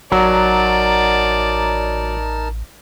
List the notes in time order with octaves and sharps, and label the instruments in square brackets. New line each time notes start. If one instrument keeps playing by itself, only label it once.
[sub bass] A1 [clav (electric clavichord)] F#3 [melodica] D#4 A#4 A5 [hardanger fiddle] D5